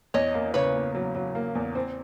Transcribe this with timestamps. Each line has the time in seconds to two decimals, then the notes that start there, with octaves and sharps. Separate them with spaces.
0.14 E2 C#5 D#5
0.34 A#3
0.54 C#3 B4 C#5
0.75 A#3
0.95 F#3
1.15 F#3
1.35 A#3
1.55 E2
1.75 C4